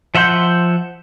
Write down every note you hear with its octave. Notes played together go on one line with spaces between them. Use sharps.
F3 E5 F#5 C6 G6